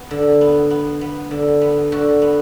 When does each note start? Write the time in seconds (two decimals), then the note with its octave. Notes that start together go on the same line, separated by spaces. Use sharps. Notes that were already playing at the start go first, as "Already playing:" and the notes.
Already playing: B3
0.11 D3
0.41 B3
0.70 B3
1.01 B3
1.31 D3
1.61 B3
1.92 D3 F#4
2.22 B3